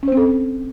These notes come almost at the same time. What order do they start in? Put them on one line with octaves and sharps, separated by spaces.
C#4 C5 C4 A4